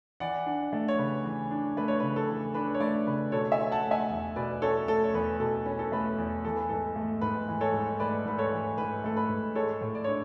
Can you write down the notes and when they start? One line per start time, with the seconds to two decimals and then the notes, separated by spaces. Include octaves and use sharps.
0.20 E3 D5 F#5
0.46 D4
0.73 A3
0.88 C#5
0.98 C#3 B4
1.24 E3
1.51 D4
1.77 A3 B4
1.88 C#5
2.00 C#3 B4
2.16 A4
2.29 E3
2.54 D4 B4
2.74 C#5
2.80 A3 B4 D5
3.07 C#3 B4
3.32 B2 A4 C#5
3.52 E5 G#5
3.58 C#4
3.71 F#5 A5
3.84 A3
3.91 E5 G#5
4.10 E2
4.36 B2 B4 D5
4.62 C#4 A4 C#5
4.88 A3 A4
5.04 C#5
5.14 E2 B4
5.40 B2 A4
5.66 C#4 B4
5.79 A4
5.92 A3 B4
6.18 E2
6.45 E3 A4
6.56 B4
6.69 G#2 A4
6.96 A3
7.21 G#2 B4
7.48 E3
7.61 A4 C#5
7.73 G#2
8.00 A3 B4 D5
8.26 G#2 B4
8.38 A4 C#5
8.52 E3
8.78 G#2 B4
9.04 A3 A4
9.17 B4
9.29 G#2
9.55 G#3 A4 C#5
9.81 A2
9.95 D5
10.04 D4 C#5